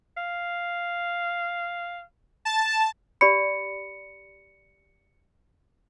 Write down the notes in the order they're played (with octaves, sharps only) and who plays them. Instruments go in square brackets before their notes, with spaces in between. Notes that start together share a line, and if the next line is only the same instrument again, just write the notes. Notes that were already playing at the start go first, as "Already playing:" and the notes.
[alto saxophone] F5
[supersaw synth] A5
[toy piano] G4 D5 B5 [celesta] C#7